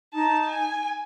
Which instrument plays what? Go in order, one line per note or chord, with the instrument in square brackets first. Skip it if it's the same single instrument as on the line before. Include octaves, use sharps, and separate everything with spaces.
[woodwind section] D#4 [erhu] A5
[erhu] G#5